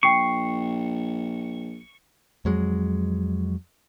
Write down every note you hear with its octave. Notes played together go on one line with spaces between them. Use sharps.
A#1 G5 C#6 C7
F2 F#3 G#3